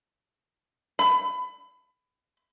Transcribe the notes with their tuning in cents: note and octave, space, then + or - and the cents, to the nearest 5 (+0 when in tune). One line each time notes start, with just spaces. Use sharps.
B5 +25